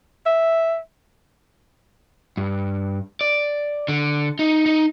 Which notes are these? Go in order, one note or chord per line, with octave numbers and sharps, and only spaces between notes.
E5
G2
D5
D3
D#4
D#4